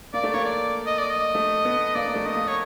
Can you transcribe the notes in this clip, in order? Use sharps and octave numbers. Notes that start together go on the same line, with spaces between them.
A#3 D5
A3
A#3 C#5
D5
D#5
D5
D#5
A3
B3
A#3 D5
A#3
A3
D#5
A#3
C#5